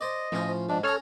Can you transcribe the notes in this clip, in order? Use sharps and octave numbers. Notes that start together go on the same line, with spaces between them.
C5 D5 D#5
A2 F3 C#4 C5
G#2 D4
C#4 A4 C#5 A#5 F6